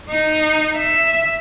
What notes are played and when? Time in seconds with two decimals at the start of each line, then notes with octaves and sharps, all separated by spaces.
0.10 D#4
0.77 E5